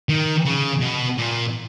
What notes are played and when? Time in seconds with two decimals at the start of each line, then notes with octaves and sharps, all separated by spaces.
0.09 D#3
0.46 C#3
0.81 B2
1.18 A#2